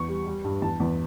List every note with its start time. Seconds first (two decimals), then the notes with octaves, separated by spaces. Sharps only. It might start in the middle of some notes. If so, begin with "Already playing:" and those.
Already playing: E2 C#6
0.08 G3
0.26 G3
0.44 G2
0.62 E2 A5
0.80 E2